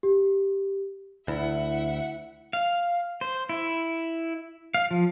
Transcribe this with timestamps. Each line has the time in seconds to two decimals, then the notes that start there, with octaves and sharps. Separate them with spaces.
0.03 G4
1.28 D2 E4 E5 F#5
2.53 F5
3.21 C5
3.49 E4
4.74 F5
4.91 F3